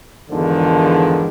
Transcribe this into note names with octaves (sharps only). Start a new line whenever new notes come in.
E2 G#2 D3 D#3 F3